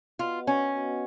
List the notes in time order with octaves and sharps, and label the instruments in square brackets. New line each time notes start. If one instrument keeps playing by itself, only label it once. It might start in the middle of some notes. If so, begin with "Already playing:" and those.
[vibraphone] B3 F#4 B4 D#5 F#5 [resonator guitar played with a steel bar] F4
[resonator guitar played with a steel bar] C#4
[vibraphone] B3 F#4 B4 D#5 F#5